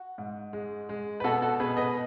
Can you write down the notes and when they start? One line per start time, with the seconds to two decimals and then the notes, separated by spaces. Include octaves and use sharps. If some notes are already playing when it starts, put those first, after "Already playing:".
Already playing: F#4
0.18 G#2
0.53 G#3
0.89 G#3
1.20 B4
1.24 B2 F#4 A4
1.42 F#4 A4
1.60 B2 G#4 B4
1.77 B4 D#5